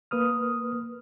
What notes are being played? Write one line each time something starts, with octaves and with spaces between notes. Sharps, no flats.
A#3 B4 D#6 F6